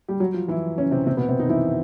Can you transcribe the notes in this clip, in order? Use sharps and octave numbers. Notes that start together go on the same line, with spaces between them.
G3 G4
F#3 F#4
F3 F4
E3 E4
C#3 C#4
C3 C4
C3 C4
B2 B3
C3 C4
D#3 D#4
E3 E4